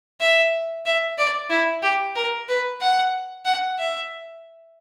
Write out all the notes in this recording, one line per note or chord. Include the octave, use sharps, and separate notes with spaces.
E5
E5
D5
E4
G4
A#4
B4
F#5
F#5
E5